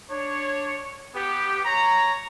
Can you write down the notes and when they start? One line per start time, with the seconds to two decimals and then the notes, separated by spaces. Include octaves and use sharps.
0.11 D4 C#5
1.15 B3 G4
1.65 C#5 A#5